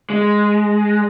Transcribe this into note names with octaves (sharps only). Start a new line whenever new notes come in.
G#3